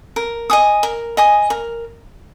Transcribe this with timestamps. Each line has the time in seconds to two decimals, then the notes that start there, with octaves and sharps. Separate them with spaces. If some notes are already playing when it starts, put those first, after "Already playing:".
0.16 A#4
0.50 D#5 G#5 D#6
0.83 A#4
1.17 D#5 G#5 D#6
1.50 A#4